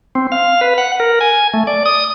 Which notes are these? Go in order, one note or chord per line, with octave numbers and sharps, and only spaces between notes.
C4
F5
B4
F#5
A#4
G#5
A3
D5
D#6